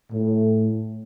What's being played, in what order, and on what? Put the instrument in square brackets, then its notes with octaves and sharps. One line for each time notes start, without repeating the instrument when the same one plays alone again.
[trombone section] A2